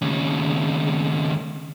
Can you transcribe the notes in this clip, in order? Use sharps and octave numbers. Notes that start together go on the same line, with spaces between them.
D#2 C#3